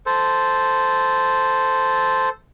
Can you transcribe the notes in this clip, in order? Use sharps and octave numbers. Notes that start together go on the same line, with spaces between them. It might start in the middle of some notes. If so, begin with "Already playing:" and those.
A4 C5